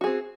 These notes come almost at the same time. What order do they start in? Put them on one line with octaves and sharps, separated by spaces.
F#4 G#4 C4